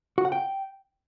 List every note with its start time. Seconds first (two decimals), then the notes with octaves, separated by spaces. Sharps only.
0.18 F#4
0.25 F#5
0.32 G5